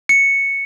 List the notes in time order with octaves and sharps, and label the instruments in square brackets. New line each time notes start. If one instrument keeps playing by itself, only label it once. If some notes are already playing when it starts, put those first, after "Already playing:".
[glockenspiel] C#7